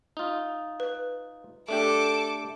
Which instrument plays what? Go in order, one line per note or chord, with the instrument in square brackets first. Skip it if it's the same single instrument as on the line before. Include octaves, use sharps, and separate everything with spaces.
[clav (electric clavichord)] D#4 F4
[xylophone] B4
[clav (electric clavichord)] A3 D4 G4 [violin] A4 D6